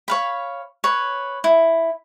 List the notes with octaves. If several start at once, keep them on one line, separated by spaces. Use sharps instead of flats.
C#5 F5 B5
B4 C#5
E4